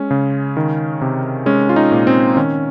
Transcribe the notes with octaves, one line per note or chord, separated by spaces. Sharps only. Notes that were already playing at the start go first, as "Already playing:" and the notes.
Already playing: G#3 C#4
C#3
D#3
C3
G#3 C#4
F4
D#4
A#2
C4
D#3 C#4